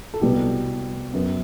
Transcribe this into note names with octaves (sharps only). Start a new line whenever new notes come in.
A4
C2 B2 G3 B3 G4
F#2 F#3 B3